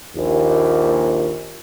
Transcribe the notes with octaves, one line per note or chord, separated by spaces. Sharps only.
A#1 D#2